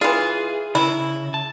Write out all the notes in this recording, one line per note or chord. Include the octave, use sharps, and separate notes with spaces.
E3 F4 G#4
C#3 E4
A5